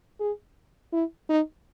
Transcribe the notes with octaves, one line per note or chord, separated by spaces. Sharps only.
G#4
E4
D#4